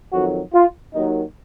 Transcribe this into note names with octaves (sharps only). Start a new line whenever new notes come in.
F2 D#3 F#3 F#4
F4
D#2 D#3 F#3 D#4